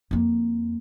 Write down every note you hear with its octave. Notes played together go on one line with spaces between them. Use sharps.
F2 A#3